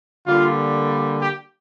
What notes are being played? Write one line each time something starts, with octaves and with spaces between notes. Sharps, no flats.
D3 G3 A#3 F4
G4